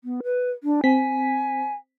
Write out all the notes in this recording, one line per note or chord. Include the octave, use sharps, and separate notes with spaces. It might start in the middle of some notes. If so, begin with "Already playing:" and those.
B3
B4
D4
C4 G#5 B6